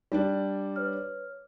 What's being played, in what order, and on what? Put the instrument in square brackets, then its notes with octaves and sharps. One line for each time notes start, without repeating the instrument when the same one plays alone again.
[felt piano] G3 D4 D5
[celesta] B4 C#5 F6